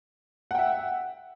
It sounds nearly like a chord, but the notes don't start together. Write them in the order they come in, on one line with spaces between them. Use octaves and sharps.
F#5 G5 E5